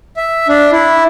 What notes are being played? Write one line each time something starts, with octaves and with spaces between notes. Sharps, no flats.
E5
D4
E4